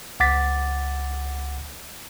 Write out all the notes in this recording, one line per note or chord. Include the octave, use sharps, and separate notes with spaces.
C#2 F#5 D6 A6 B6